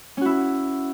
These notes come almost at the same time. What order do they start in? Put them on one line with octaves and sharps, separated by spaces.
C#4 F#4 E4